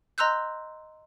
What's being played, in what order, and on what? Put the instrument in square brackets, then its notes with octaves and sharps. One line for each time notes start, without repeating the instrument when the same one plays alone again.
[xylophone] D#5 A#5 C6 E6 F#6 G6